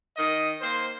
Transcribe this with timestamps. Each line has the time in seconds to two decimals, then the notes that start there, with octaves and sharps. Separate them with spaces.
0.16 D#3 D#5
0.61 A#3 C5